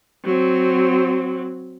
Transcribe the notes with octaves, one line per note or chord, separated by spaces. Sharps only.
F#3 C4